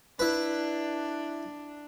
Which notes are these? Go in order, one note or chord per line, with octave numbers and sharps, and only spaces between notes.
D4 E4 B4